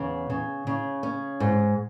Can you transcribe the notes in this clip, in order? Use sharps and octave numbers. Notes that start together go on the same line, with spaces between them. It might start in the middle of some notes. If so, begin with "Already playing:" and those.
Already playing: E2 C#3
C#3
C#3
C#4
G#2